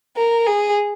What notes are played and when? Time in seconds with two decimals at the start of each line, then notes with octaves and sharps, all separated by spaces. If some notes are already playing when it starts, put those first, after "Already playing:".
0.17 A#4
0.46 G#4